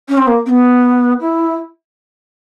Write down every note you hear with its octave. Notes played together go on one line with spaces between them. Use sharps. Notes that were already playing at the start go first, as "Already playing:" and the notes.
C#4
C4
A#3
C4
B3
E4